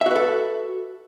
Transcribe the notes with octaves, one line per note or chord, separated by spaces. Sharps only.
F#4 A4 B4 E5